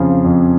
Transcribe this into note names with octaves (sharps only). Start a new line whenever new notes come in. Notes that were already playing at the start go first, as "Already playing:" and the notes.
Already playing: F2 C#3 F3
F2